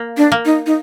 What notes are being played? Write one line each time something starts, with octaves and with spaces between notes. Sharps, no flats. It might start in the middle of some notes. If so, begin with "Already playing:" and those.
Already playing: A#3
D4
A#3
D#4
D#4